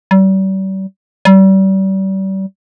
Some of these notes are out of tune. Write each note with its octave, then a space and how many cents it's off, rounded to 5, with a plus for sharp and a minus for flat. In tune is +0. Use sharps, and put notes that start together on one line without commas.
G3 -40
G3 -35